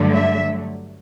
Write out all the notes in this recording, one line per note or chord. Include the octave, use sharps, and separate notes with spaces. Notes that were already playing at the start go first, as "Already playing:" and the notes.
Already playing: G2 D3 F#3 A3
E5